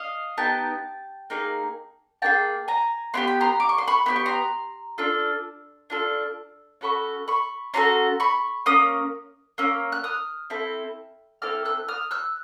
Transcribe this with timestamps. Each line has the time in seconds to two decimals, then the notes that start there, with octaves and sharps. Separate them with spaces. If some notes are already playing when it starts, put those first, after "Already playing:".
Already playing: D#5 F5
0.38 B3 D#4 G4 G5 A5
1.30 A#3 D#4 G#4
2.22 A#3 D#4 G#4 G5 A5
2.68 G#5 A#5
3.14 B3 E4 G4 C6
3.27 B5
3.41 A#5 C6
3.60 D6
3.69 C#6
3.78 C6
3.88 B5 C#6
4.06 B3 E4 G4 C6
4.16 C#6
4.26 A#5 C6
4.98 D4 F4 A4
5.90 D4 F4 A4
6.81 C#4 F#4 A4 B5 C#6
7.28 B5 C#6
7.74 C#4 F#4 A4 A#5 C6
8.20 B5 C#6
8.66 A#3 C#4 D#6
9.58 A#3 C#4 E6
9.92 F#6
10.04 D#6 F6
10.50 C4 E4 A4
11.42 C4 E4 A4 F6
11.65 E6 F#6
11.88 D#6 F6
12.11 E6 F#6